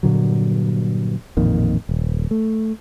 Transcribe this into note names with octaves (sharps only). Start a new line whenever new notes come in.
G2 A#2 D3 F#3
A1 F2 A#2 D#3
D#1
A3